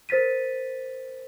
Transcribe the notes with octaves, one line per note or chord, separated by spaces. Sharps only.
A#4 C5 A6 B6 D#7